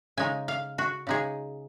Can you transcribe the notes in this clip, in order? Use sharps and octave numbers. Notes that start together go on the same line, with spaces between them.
C#3 G#3 D#4 G#5
F5
F#4
C#3 G#3 D#4 G#4